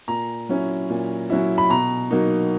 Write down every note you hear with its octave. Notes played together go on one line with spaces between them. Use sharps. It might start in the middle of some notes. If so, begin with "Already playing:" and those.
A#2 A#5
F#3 C#4 E4
A#2
F#3 C#4 E4
B5
B2 A#5
F#3 A#3 D#4